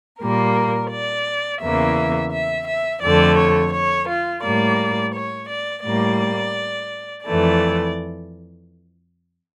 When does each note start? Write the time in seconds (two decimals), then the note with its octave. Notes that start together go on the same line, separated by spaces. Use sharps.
0.22 A#2 G3 A#3 A#4
0.92 D5
1.62 E2 C#3 E3 A#3 E5
2.33 E5
2.68 E5
3.03 F2 D3 A3 D5
3.39 C#5
3.74 C#5
4.09 F4
4.44 A2 G3 A#3 D5
5.15 C#5
5.50 D5
5.85 A2 G3 A#3 D5
7.26 F2 E3 A3 D5